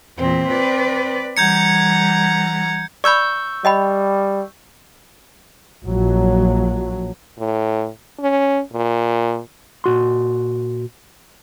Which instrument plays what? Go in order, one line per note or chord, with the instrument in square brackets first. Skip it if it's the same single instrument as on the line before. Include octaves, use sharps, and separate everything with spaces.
[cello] E2 A#2 [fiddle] C4
[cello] B4 D5
[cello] E3 G3 [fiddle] F#5 A#5 [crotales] G6 G#6 C#7
[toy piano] D5 B5 [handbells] C#6 E6 G6
[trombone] G3 [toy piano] D#5 G5 B5
[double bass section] A#1 F#3
[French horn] A2
C#4
A#2
[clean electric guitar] A#2 F#4 C6